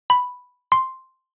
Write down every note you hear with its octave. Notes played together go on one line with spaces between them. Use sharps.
B5
C6